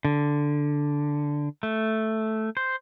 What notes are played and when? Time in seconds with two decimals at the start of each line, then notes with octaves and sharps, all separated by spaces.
0.05 D3
1.63 A3
2.57 C5